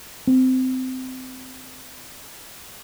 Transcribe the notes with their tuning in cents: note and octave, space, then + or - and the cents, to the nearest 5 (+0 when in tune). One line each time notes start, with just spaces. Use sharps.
C4 -20